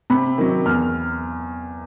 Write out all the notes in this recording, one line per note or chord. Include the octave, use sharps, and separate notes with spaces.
C3 B5
D#3 F#3
E2 F6